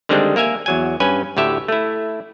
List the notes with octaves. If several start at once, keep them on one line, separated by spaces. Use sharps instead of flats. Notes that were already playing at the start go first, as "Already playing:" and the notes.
D3 D#3 G3 G#3 C4 D4
A#3 A#4 E5 G#5
E2 F#3 G#5
G2 C#4 B4 G#5
D2 A2 G4 E5
A3 E4